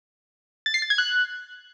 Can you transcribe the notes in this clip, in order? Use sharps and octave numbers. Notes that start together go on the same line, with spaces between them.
A6
C7
A6
G#6
F#6